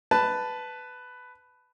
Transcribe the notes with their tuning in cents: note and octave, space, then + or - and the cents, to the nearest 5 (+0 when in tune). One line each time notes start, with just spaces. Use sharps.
B4 +10 A5 +0